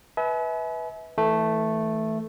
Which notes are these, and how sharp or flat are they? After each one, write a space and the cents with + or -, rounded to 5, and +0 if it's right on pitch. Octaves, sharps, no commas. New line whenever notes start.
B4 +0 E5 -35 G#5 +40
E3 -25 A3 +0